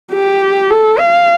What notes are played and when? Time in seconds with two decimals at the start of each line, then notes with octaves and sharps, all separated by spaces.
0.12 G4
0.71 A4
0.99 F5